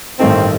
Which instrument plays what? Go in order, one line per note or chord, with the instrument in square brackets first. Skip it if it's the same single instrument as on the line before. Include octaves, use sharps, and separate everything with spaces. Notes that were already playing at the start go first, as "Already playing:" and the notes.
[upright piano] A1 G2 D#3 A3 D#4 [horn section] C4